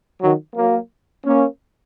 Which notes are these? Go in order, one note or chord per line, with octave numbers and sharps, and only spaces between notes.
D#3 F#3
F#3 A#3
A#3 C#4